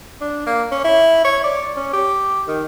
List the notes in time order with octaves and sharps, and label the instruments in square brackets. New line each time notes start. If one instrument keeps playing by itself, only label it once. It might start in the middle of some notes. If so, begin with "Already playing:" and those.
[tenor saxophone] D4
A#3
C#4
E4
C#5
D5
C#4
G4
D#3